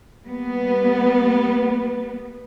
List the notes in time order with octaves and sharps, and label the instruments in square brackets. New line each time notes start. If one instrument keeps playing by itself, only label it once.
[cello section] G3 A#3 B3